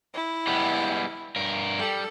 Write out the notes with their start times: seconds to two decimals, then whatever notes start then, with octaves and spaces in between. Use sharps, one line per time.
0.14 E4
0.47 G3 G#3 B3
1.36 G2 A#4
1.79 G3 A4